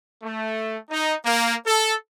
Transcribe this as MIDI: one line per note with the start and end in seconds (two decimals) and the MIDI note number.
0.22 0.76 57
0.89 1.15 63
1.24 1.53 58
1.66 1.93 69